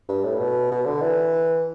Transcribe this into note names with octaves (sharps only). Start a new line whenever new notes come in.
G2
A2
B2
B2
D3
E3